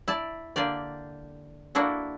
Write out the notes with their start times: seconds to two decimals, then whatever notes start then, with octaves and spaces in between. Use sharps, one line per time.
0.08 E4 D5 A5
0.56 D3 A#3 G4 D5
1.75 A#3 D4 E4 F#4 A4